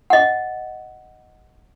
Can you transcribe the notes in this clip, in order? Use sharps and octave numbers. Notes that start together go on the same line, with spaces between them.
D#5 F#5